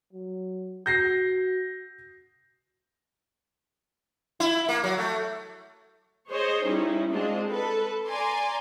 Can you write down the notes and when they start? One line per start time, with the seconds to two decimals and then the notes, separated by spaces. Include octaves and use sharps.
0.13 F#3
0.86 F#4 G6 A#6 C7
4.40 E4
4.69 A#3
4.84 F#3
4.98 A3
6.30 G#4 C5 C#5 D#5
6.63 G3 C#4 D#4 E4
7.10 G#3 C4 D4 F4 D#5
7.47 A4 B4
8.06 D5 G#5 A#5 C6 D6